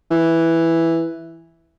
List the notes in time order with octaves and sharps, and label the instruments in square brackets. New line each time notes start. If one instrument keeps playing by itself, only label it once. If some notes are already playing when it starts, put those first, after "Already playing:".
[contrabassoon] E3